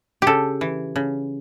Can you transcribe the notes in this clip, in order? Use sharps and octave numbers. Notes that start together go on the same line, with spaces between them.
C#3 G4 A4
E3
C#3